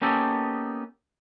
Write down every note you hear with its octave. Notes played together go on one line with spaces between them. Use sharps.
A#3 B3 C#4 D#4 G4 A4